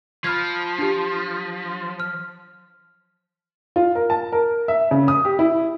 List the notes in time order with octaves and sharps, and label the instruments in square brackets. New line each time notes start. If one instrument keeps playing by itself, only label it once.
[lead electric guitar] F3 [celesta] B5 F6 G#6
[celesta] D4 G4
F6
[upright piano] F4
A#4
A5
A#4
E5
C#3
D#6
G4
E4